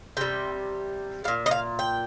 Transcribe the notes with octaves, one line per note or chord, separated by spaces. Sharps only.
C3 G3 G5
G3 F5
A#2
D#5
F5
G5